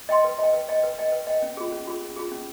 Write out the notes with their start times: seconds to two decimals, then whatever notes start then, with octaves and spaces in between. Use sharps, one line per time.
0.09 D#5 G5 C6
0.24 B4
0.39 D#5 G5
0.53 B4
0.69 D#5 G5
0.84 B4
0.98 D#5 G5
1.12 B4
1.27 D#5 G5
1.42 C#4
1.57 F4 G#4
1.72 C#4
1.87 F4 G#4
2.02 C#4
2.16 F4 G#4
2.32 C#4